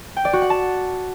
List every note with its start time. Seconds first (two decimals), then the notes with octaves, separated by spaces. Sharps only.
0.16 G5
0.25 D5
0.33 F#4
0.42 F#5
0.50 A5